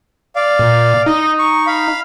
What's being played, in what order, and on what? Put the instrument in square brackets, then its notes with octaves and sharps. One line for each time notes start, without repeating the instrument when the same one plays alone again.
[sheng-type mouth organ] D5 F5
[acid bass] A#2
[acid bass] D#4 [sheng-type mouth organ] D#5
[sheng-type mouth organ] C#6
F5 B5